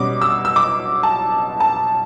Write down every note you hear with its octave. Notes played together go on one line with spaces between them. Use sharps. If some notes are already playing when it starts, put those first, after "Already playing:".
Already playing: B2 G3 C#4 D6
E6
E6
D6
A5
A5